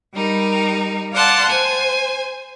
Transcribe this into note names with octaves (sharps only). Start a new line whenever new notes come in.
G3 D#4 A#4
D5 F5 F#5 A5 C6
C5 G#5